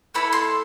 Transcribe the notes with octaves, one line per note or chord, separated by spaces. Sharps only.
A3 E4 A4 B5
C6